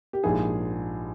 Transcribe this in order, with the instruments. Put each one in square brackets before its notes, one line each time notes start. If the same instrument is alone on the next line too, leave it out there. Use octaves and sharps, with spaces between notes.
[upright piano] G4
[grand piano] A#1 G#2 F3 A#3 E4 [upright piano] G#4